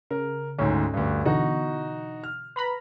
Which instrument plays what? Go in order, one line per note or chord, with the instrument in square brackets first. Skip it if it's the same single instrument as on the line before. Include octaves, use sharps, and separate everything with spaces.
[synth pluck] C#3 [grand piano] A#4
[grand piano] D2 G#2 [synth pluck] C#4
[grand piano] D2 G2
[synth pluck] B2 D3 E3 [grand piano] D#4 F#4 F#5
[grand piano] F6
[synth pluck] B4 A#5 B5